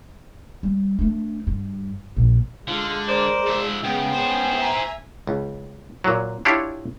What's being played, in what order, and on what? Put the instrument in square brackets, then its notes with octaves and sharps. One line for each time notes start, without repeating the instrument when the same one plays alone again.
[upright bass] G3
A3 D4
G2
A#1 F3
[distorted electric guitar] D3 [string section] G#3 [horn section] F4
[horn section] A#4 C5 D5
[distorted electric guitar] F3 E5
[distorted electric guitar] C#3 [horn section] B3 G5
[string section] G#3 C#4 [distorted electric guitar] G#4 C5
[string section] E5 G#5 A#5
[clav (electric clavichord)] C#2
A#2 F#3
D4 E4 F4 G4 C#5